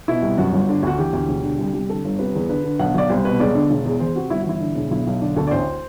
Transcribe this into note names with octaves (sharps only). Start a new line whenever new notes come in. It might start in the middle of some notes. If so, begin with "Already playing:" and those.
B2 E4
C2
F#2 F#4
G1
D3
D2 F#4
E3 G4
D2
E1
D3
C2
C2
D3 A4
G1
C3 B4
E2
D3 B4
D3
B1 F#5
B1 D5
C2 C5
B2 B4
E1 D5
D3
E1
E2
E3 C5
C3 F#4
G1 E4
F#4
E3 E4
D3
E1
B1 E4
B1
D3 D4
D2 A4
D5
A1 C5